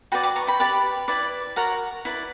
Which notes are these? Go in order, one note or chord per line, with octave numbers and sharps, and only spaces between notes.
F#4 B4 D5 G5 B5
B5 D6
A#5 C#6
G5 B5
G4 B4 D5
E4 B4 D5
F#4 A#4 C#5 F#5 A#5
E4 B4 D5